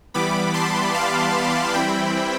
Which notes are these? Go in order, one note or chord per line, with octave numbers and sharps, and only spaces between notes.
E3 G3 B3 B5 D6
A5 C6
F5 A5
E3 G3 C4 E4 G5 B5